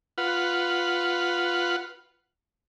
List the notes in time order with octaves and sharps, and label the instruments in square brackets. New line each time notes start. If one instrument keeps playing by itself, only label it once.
[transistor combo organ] F4 B4 F#5